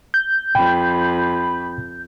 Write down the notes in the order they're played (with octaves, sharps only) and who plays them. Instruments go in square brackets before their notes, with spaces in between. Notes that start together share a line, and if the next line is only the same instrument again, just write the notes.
[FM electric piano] G6
[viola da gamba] F2 [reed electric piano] G5 [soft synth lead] B5